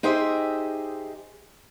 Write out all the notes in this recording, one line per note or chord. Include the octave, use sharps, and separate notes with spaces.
D#4 G4 G#4 C5 D#5 E5